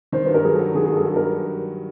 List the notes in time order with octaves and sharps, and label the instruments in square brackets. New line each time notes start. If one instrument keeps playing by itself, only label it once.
[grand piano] D#3 [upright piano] C5
[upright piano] B4
[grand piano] G2
[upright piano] A#4
[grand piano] F#3 [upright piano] G#4
[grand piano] F#3 [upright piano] A4
[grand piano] D#3 [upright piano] G#4
[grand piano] G2 [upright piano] G#4
[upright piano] A4
[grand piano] G2
[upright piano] A#4